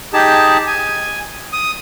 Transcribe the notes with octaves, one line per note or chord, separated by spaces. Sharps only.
D#4 G4 G#4 A5
G#5
D#6